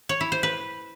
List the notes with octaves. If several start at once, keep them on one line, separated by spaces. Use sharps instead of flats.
C#5
E4
C5
B4